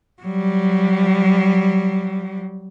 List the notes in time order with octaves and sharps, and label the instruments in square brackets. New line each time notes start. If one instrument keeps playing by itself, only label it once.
[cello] F#3 G3